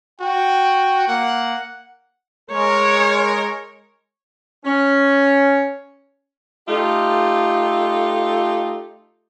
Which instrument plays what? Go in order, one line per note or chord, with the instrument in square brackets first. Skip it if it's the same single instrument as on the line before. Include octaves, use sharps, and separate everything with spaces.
[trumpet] F#4 [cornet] G5
[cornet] A#3 [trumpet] F#5
[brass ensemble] G#3 A#4 [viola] C#5
[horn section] C#4
[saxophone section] A3 D#4 F4 G4 A4